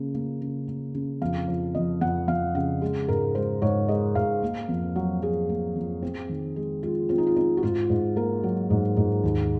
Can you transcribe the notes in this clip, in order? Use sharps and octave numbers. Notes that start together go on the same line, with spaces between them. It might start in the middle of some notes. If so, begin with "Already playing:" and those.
Already playing: C#3 A#3
A#3
C#3
A#3
C#3
F2 F5
F3
F2 D#5
F2 F#5
F2 F5
C#3 F#5
G#3
G#2 A#4
G#3 C5
G#2 C#5
G#3 D#5
G#2 F5
A#3
F2
F#3
F#3 G#4
A#3
F2
C4
D#3
G#3
G#3 F4
C4 F4
D#4
F4
C4 D#4
F#4
G#2 F4
G#2
A#3 A#4
F#3
G#2
G#2
D#2